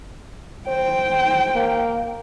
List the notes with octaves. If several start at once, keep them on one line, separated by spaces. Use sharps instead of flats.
C5 G5
A#3